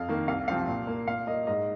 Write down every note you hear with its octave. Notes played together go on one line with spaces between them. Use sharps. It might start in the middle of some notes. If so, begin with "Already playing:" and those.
Already playing: F2 F5
D#3 A#3
C2 F5
C3 F3 C4 F5
A#2
A#3
A#2 F5
A#3 D#5
G#2 D#5